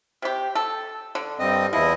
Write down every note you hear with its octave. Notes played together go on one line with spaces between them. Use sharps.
C3 G4
A4
D3
G2 C4 D#5
E2 F3 E4 D#5